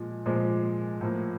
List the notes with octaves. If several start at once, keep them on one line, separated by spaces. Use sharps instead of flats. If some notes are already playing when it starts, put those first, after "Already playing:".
Already playing: A#2 F3 G#3
A#2 F3 G#3
A2 F3 A#3